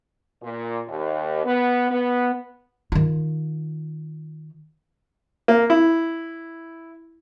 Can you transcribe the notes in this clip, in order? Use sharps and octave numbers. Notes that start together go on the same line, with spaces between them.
A#2
D#2
B3
B3
D#3 F4
A#3
E4